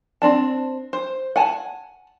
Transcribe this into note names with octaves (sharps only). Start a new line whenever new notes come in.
C4 D4 A5
C5
F#5 G#5 A5